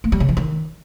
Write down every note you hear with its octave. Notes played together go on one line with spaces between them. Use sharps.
A#3
G3
C#3
E3
D#3